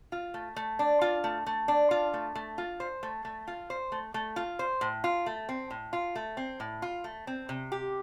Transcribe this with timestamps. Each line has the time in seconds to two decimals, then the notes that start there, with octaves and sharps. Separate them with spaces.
0.12 F4
0.34 A3
0.56 A3
0.79 D4
1.01 F4
1.24 A3
1.46 A3
1.68 D4
1.91 F4
2.14 A3
2.35 A3
2.58 F4
2.80 C5
3.03 A3
3.25 A3
3.47 F4
3.70 C5
3.92 A3
4.14 A3
4.36 F4
4.59 C5
4.81 A2
5.04 F4
5.26 A3
5.49 C4
5.70 A2
5.93 F4
6.15 A3
6.37 C4
6.60 A2
6.82 F4
7.04 A3
7.27 C4
7.49 C3
7.72 G4